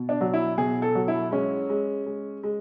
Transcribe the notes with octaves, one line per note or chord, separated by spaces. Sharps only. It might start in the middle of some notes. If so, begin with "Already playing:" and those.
Already playing: B2
D4
F#3
E4
B2 G#4
A4
F#3
E4
G#3 C#4
G#3
G#3
G#3